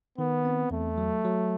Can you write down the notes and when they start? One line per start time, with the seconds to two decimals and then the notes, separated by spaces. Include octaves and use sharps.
0.18 D#3 B3
0.45 C4
0.71 E2 A3
0.98 F#3
1.25 F#3